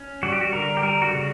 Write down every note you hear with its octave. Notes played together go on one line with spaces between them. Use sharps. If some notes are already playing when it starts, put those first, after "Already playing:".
Already playing: C#4
G3 F#4
G4
F#4
D3 A#4
G4
G3 A#4
F#4
C#3